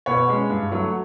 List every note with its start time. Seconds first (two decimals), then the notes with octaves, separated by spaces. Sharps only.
0.06 B2 B4 C#5
0.29 G#3 C#4
0.50 G2
0.71 D3 F#3 A3